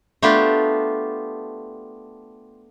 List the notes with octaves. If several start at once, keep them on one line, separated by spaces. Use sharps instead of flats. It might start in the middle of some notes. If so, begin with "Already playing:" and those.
A3 B3 D4 F4 G4